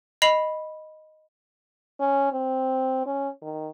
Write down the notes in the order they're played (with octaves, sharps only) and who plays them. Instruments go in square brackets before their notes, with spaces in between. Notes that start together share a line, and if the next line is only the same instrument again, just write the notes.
[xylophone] D#5 B5 C7 F7 F#7
[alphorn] C#4
C4
C#4
D#3